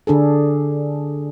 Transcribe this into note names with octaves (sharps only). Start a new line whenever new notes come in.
D3 D4 G#4 A4